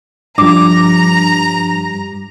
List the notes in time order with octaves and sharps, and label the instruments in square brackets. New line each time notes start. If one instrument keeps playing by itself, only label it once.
[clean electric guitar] G2 G3 [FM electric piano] F3 D4 [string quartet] A#5 [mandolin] D6